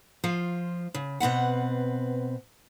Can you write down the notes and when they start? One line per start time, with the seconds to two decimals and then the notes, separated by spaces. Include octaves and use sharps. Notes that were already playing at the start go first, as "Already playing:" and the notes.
0.24 F3 F4
0.94 C#3
1.20 B2 C4 B4 F#5